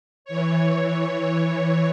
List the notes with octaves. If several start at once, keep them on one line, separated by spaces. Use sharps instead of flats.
E3 C#5